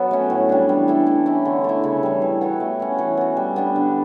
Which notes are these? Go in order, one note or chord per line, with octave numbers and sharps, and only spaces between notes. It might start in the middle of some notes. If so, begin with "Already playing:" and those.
Already playing: F#3 B3 F#4 A4
A3 C#4
A2
G3 D4
E3
A3 E4 A4
A3
C#4 E4
D3
A3 E4
C#3
E3 G3
E3
B3 F#4 C#5
A3
C#4 F#4
E3
B3 F#4
G3
B3 D4 G4
D3